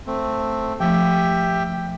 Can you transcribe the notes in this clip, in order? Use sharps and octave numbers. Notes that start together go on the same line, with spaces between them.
A3 C4
F3 A3 G4 E5 G5